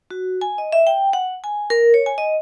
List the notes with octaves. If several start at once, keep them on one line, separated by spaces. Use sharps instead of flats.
F#4
G#5
D#5
E5
G5
F#5
G#5
A#4
C#5
G#5
D#5